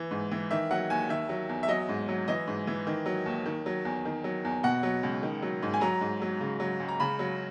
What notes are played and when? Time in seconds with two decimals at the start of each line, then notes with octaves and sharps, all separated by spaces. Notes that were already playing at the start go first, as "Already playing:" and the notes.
Already playing: E3
0.11 G#2
0.31 E3
0.51 D#3 E5
0.71 F#3 F#5
0.90 D#2 G#5
1.09 D#3 E5
1.29 F#3
1.49 E2
1.63 E5
1.68 F#3 D#5
1.89 G#2
2.09 F#3
2.28 E3 D#5
2.47 G#2
2.67 E3
2.87 D#3
3.06 F#3
3.26 D#2
3.46 D#3
3.66 F#3
3.85 E2
4.05 D#3
4.24 F#3
4.45 E2
4.63 B2 F#5
4.83 F#3
5.03 C#2
5.23 D#3
5.42 F#3
5.63 G#2
5.74 G#5
5.81 F#3 A#5
6.01 G#2
6.22 F#3
6.41 C#3
6.60 F#3
6.80 C#2
6.89 A#5
7.00 C#3 B5
7.19 F#3